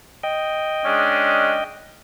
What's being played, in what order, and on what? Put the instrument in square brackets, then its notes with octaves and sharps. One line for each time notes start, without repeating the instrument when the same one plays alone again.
[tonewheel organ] D#5 G5
[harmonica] G#3 C#4 D4